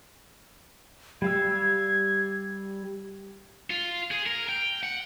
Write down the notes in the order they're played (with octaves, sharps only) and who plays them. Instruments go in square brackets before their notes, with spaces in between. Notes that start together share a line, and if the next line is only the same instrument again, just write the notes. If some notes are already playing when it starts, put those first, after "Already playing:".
[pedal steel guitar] G3 F5 E6 [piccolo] G#6
[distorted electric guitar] F4
G#4
A#4
G5
F#5